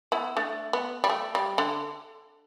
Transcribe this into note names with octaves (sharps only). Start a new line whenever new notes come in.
B3 E4
A3 D4
B3
G3
A3
G3
D3